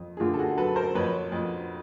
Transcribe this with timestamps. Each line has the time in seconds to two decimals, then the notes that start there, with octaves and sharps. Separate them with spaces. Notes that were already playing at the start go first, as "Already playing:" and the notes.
Already playing: F2
0.17 G#4
0.20 D3 F4 G4
0.34 A4
0.39 F#4 G#4
0.58 F#3 A4 B4
0.76 A#4 C5
0.95 F2 B4 C#5
1.32 F2